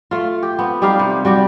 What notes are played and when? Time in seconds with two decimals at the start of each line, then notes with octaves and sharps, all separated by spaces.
0.11 A3 F4
0.43 G4
0.59 B3 C4
0.82 G3 D#4 G4 F5
0.99 C3
1.25 G3 F#4 G4